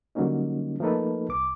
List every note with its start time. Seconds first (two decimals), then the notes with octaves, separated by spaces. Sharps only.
0.15 D3 F#3 G3 A#3 C#4 D#4
0.80 F3 A3 A#3 D#4 A4 B4
1.29 C2 D6